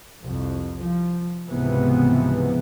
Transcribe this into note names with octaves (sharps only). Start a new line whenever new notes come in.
C2 F2
F3
C#2 G#2 C3 E3 F3 B3